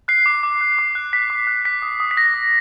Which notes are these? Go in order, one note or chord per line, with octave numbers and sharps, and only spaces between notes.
F#6 C7
D6
D6
F#6
D6
F#6
F#6 B6
D6
F#6
F#6 B6
D#6
D#6
B6
D#6 A#6
D#6